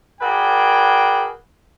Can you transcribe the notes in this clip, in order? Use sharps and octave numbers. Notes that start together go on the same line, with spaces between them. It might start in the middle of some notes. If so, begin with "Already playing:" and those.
F#4 G#4 A#4 B4 D5 G5